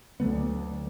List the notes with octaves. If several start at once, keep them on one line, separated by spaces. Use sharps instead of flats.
D2 D3 F#3 A3 B3